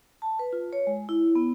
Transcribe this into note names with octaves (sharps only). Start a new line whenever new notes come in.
A5
B4
F4
C#5
G#3
E4
B3